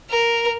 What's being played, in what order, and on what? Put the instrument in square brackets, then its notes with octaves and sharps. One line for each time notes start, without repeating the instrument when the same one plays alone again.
[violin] A#4